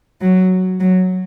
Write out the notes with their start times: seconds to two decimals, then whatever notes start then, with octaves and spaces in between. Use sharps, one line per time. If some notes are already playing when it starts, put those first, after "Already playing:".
0.21 F#3
0.80 F#3